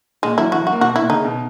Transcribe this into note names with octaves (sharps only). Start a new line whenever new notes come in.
A#2 G#3
F#3 E4
E3 F#4
F#3
F#4
A#3
B2 F#4
A#2 E4
C#3 D#4
B2